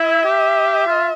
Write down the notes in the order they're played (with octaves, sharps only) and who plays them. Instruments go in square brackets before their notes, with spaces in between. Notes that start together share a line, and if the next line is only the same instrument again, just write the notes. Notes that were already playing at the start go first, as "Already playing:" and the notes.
Already playing: [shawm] E4 [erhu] E5
[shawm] G4
F4